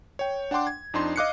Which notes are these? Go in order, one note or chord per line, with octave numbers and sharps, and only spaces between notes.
C#5 G5
D4 F#5 G5 C6 D6
G#6
F2 D4 D#4 C6
D#5 F5 D6 F#6 C7 C#7